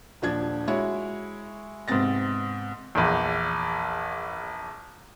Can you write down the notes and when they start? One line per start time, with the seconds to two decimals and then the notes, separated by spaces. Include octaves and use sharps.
0.22 D#1 F3 D4 G#6
0.68 G#3 E4 F#4 C#5
1.88 G#2 C3 B3 C4 A6 A#6
2.95 A#1 E2